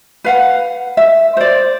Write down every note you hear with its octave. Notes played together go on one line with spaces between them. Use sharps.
B4 F5 F#5
E5
C5 D5